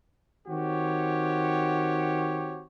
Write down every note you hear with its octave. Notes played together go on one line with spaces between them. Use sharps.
D#3 C4 F#4 G4 C#5